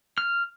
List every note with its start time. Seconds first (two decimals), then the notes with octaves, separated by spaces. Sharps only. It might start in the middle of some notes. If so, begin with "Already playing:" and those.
0.18 F6